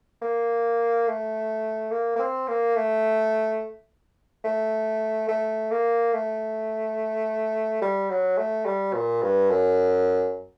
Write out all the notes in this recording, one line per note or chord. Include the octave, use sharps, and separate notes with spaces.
A#3
A3
A#3
A#3
C4
A#3
A3
A3
A3
A#3
A3
G3
F#3
A3
G3
A#2
G2
F#2